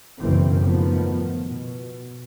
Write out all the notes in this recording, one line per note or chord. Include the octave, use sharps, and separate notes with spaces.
F#1 B1 D#3 E3 C4
A2 D#3 F3 B3
B2